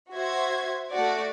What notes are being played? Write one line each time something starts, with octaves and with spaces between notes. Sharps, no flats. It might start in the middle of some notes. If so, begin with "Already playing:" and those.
F#4 C5 E5 G#6
A3 F#4 D5